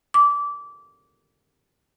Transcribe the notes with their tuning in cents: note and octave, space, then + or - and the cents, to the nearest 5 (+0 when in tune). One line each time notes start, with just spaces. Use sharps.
D6 -20